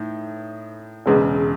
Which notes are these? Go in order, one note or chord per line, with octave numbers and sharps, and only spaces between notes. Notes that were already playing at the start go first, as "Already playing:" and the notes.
Already playing: A2 D#4
E1 E2 C#3 G#3